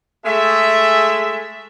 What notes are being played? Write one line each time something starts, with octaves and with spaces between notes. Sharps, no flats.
G#3 A3 G#4 E5